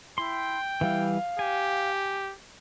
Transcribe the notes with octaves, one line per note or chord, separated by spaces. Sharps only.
E4 G5 C6
E3 G3 E4 F5
G4 G#5